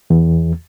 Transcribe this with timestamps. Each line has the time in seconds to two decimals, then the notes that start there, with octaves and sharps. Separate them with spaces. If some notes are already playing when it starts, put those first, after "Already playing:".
0.10 E2